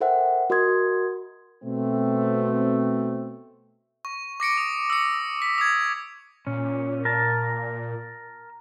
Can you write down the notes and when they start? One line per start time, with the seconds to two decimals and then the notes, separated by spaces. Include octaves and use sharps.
0.01 A4 A#4 C5 E5 F#5 G5
0.50 F#4 A#4 D#5 C6 D#6 G#6
1.63 B2 A3 C4
4.05 C#6
4.40 D6 A#6 C#7 D7
4.57 D#6
4.90 E6 C#7
5.42 B6
5.58 D#6 G#6
6.47 A#2 C#4
7.05 A#4 A5